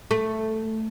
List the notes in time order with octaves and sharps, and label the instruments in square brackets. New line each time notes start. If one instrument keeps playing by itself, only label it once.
[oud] A3